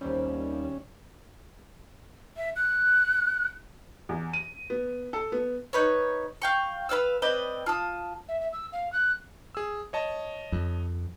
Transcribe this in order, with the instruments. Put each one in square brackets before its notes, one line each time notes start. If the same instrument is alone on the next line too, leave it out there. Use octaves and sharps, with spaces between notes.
[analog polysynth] D#2 G3 [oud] F3 C4 [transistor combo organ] C#4
[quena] E5
F#6
[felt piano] E2
D#7
B3
A4
B3
[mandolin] D#4 B4 C#5
F5 G5 C#6
B4 D5 F5 E6
C4 B4 D5 D#5
F4 A5 D#6
[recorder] E5
E5
E6
F5
F#6
[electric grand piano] G#4 E6
C#5 D#5 A5
[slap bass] F2